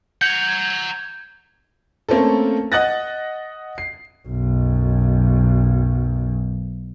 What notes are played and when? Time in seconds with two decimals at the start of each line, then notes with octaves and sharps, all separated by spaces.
0.22 F#5 A#5 G6 G#6
2.09 A3 A#3 C4 C#4 A4
2.72 D#5 F#5 D#6 F#6 A6 A#6
3.78 C7
4.27 B1 F#2